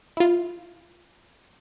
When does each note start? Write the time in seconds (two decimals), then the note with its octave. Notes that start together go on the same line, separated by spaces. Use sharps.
0.17 E4 F4